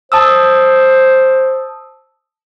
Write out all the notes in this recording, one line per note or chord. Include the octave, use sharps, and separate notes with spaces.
C5 A5 D#6 E6